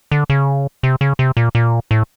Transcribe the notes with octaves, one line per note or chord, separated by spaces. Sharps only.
D3
C#3
C3
C#3
C3
A#2
A#2
A2